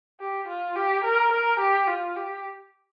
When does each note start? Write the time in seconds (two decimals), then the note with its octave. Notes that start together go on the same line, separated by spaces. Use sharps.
0.20 G4
0.48 F4
0.76 G4
1.04 A#4
1.32 A#4
1.60 G4
1.88 F4
2.16 G4